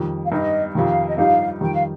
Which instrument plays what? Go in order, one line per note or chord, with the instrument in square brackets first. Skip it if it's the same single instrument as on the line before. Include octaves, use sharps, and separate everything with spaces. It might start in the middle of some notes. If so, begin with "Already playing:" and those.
Already playing: [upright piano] F2 D#3 G3
[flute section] F5
[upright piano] G2 G3 D#4 G4 [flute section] D#5
[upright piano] F2 C3 D#3 [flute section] F5
[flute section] D#5
[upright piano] G2 F3 D#4 G4 [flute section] F5
[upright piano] F2 D#3 G3 [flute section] G5
[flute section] F5